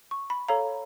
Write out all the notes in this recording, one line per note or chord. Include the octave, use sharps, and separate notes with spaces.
C#6
B5
A4 C#5 F5 A#5